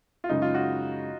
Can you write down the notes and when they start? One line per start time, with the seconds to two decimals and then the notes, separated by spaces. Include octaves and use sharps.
0.24 F4
0.29 F#2 C#3 G#3 D#4
0.42 F4
0.55 F#4